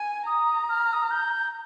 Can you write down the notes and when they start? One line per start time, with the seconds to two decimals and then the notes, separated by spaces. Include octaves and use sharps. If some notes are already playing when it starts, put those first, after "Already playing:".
Already playing: G#5
0.27 A#5 D#6
0.69 F6
0.93 D#6
1.02 F6
1.11 G6